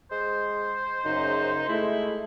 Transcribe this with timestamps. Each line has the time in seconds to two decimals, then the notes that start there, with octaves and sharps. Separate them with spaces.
0.11 G#3 C5
1.05 F#2 C#3 D#4
1.69 G#3 A3 E4